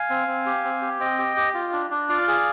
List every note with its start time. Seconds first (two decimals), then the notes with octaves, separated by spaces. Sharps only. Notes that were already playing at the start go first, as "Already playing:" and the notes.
Already playing: F5 G#5
0.10 C4
0.28 C4
0.46 G4
0.64 C4
0.82 G4
1.00 C4 D#5 G5
1.18 G4
1.37 G4
1.54 F4
1.73 D4
1.91 D4
2.09 F4 D5 F5
2.28 G#4